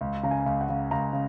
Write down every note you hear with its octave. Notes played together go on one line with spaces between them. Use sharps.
C#2
C#3 A#5
G#5
C#2
F#5
C#3
C#2 A#5
C#3